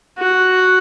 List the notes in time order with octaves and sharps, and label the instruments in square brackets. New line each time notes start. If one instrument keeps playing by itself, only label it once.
[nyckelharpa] F#4